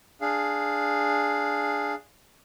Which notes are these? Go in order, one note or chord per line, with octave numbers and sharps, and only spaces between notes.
D4 G#4 F5